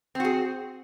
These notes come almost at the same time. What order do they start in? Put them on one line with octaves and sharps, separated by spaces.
C4 F#4 G#4